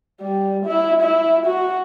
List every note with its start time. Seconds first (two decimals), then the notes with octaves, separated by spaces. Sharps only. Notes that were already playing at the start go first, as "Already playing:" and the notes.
0.21 G3
0.65 E4
1.02 E4
1.45 F#4